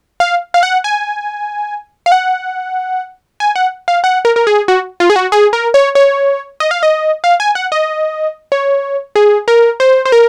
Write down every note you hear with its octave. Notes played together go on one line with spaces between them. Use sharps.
F5
F5
F#5
G#5
F5
F#5
G#5
F#5
F5
F#5
A#4
A#4
G#4
F#4
F4
G#4
F#4
G#4
A#4
C#5
C#5
D#5
F5
D#5
F5
G#5
F#5
D#5
C#5
G#4
A#4
C5
C5
A#4